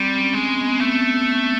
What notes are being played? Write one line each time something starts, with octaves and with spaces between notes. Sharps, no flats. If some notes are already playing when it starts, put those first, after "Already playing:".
Already playing: G3 C4
C#4
G#3
B3
C4
B3
A3 B3